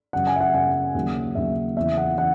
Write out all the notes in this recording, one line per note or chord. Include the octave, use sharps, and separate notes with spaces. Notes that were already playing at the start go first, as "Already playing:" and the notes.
F#2 C#3 F#3 F#5
G#5
E5
F#5
F#2 C#3 F#3 F#5
D#2 C#3 F#3
D#2 C#3 F#3 E5
E2 C#3 E3 E5
F#5
C#3 E3 F#5